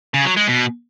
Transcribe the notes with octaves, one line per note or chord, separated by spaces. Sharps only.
C#3
F#3
G#3
B2